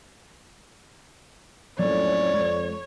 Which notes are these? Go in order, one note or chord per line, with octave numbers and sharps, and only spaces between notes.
F2 A2 F#3 G3 A#3 C#4 C#5 D5
F2 G#3